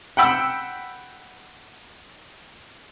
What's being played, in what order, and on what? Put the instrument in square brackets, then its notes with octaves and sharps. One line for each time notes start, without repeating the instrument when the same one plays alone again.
[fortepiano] F#5 G5 B5 E6